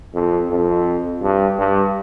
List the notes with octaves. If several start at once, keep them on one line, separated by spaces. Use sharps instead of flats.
F2
F2
G2
G2